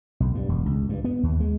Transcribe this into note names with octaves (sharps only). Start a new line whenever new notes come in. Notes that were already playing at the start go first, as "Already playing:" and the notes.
B1
G2
E1
C#2
G2
B3
D#2
G#3